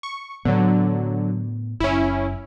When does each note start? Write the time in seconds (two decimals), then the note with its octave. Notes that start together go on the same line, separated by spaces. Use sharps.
0.03 C#6
0.45 A2 D3 F#3 B3
1.80 F#1 C#4 E4